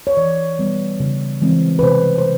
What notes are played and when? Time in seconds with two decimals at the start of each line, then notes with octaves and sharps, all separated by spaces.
0.07 C#5
0.17 E3 D5
0.59 G3 B3
1.00 C#3
1.41 E3 G#3 C4
1.79 B4
1.83 C3 C5
2.18 C5